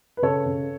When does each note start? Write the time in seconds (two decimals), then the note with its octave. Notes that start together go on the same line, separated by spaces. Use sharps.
0.17 B4
0.23 C#3 A4 C#5
0.46 C#3